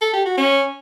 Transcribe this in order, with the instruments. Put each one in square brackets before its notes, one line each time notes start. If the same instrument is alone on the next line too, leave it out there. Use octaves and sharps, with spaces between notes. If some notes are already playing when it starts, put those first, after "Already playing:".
[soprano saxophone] A4
G4
F#4
C#4